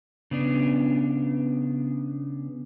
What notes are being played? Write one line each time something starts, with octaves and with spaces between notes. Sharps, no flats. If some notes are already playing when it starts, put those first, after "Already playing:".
C#3 B3 D4